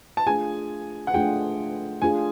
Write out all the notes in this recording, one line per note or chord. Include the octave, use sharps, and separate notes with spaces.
A5
A3 D4 F4 G#4 G#5
F#5
A3 D4 F4 G#4 G5
A3 D4 F4 G#4 G#5